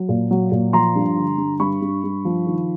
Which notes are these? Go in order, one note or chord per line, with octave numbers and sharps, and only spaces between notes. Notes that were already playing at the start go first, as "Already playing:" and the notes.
Already playing: F#3
A#2
F#3
A#2
F3 A#5 C6
G2
D3
G2
G2 B5 C#6
G2
G2
F3
D#3